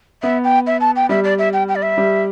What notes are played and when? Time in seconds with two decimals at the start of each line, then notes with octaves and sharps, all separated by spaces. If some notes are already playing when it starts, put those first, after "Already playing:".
0.22 B3 E5
0.44 G5
0.67 E5
0.81 A5
0.96 G5
1.09 G3 E5
1.24 D5
1.39 E5
1.53 G5
1.69 G5
1.75 D5
1.82 E5
1.97 G3